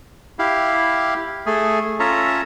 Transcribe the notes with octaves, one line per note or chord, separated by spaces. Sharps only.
E4 G4 F5
A3 G#4
C#4 F4 A4 C#5 E5 A#5